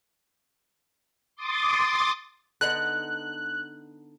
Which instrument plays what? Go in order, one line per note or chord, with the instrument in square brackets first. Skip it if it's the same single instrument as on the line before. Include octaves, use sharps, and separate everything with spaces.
[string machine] C6 D6 D#6 A6
[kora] D3 B3 D#4 [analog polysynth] F#6